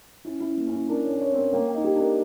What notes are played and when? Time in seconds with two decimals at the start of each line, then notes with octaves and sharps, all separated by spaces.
0.25 C#4 E4
0.41 E4
0.47 C#4
0.57 A#3
0.67 C#4
0.73 E4
0.89 D4 A#4
1.05 C#5
1.11 C#4
1.22 C#5
1.32 C4 A#4
1.53 A#3 G5
1.68 G5
1.74 D#4
1.84 G4
1.96 D4 A#4